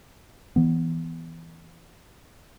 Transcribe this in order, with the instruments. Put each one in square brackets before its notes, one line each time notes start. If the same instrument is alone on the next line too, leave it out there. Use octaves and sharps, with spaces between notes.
[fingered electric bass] E3 B3